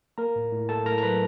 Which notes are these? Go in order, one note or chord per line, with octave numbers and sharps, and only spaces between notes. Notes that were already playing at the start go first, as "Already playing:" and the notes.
A#3 A#4 A#5
A2
A2
A#3 A4 A5
A2 A#4 A#5
A#5
F#3 B4 B5